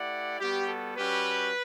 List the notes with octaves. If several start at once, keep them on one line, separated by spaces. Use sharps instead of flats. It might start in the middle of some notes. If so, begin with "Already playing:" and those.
Already playing: A3 E4 G4 D5 F#5
G3 B3 F#4 G4
A4
G3 C#4 F#4 G4 B4